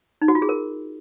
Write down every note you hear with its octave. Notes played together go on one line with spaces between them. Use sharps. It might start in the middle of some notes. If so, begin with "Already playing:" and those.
D#4
F#4
F4
G#4
A#4